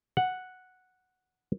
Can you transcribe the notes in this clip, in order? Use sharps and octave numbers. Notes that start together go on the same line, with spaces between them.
F#5